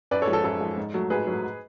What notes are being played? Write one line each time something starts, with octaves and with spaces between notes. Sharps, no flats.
F#2 B4 D5
A4 C#5
F3 G#3
A4
F#2 A4
F3 G#3
G#2
F#3 A3
G#2 G#4 B4
F#3 A3